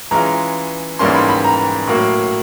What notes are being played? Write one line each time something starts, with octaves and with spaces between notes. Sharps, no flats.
E3 G#3 C#4 F4 A#5
G#2 E3 G3 A#3 C#4 C6
B5
B5
A#5
A2 F#3 A#3